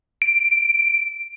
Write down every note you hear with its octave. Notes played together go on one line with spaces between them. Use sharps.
D7